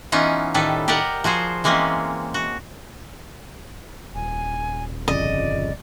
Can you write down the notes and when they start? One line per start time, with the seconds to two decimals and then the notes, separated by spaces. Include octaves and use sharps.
0.12 E3 B3 C#4 D#4 F4
0.54 A2 D#3 G3 A4 B4
0.88 G4 A#4 D5 D#5 F#5
1.24 F3 F#4 G#4 C5
1.64 E3 G#3 A#3 C4 C#4
2.34 F#4
4.15 D#1 G#5
5.08 G1 F2 C#3 D5 D#5